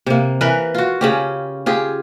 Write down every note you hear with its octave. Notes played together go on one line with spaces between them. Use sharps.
C3 A#3
E3 A#4 B4
F4 F#4
C#3 C#4 G4
F4 G4 G#4